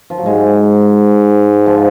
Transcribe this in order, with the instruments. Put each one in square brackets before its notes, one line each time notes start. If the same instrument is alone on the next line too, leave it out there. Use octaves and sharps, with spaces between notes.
[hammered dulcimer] F3
F#3
[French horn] G#2 [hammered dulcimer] G#3
[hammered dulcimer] F3